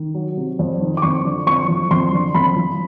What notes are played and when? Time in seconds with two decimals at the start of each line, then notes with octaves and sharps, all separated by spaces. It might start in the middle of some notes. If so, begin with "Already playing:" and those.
Already playing: D#3
0.15 F#3
0.37 C3
0.59 F2
0.81 D#3
0.97 D6
1.02 F2 C#6
1.25 D3
1.47 F2 C#6
1.68 F3
1.91 F2 C6
2.13 D3
2.34 F2 B5
2.56 F3